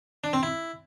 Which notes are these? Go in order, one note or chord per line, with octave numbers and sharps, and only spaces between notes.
D4
C4
E4